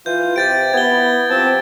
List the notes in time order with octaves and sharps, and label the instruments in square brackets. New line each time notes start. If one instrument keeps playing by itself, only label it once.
[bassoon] E3 [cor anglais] F4 [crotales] G6
[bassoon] C3 [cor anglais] G4 [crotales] G6 A6 D7
[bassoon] B3 [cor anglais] E4 [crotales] G#6 G7
[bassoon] F3 [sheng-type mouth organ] C4 A5 [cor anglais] G4